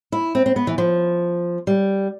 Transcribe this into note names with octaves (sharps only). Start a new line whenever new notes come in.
E4
C4
C4
B3
E3
F3
G3